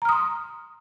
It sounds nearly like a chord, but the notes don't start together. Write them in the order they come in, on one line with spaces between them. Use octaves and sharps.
A#5 F6 D#6 C6